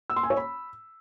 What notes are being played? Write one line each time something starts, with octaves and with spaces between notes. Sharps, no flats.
E6
C6
G#5
C#5
B5